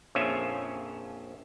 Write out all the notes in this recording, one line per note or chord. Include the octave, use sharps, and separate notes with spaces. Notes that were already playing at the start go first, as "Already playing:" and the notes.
A#1 F2 F3 C#4 F4 E5